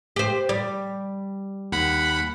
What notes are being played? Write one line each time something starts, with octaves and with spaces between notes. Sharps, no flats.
G4 C5
G3
D#2 F#5 B5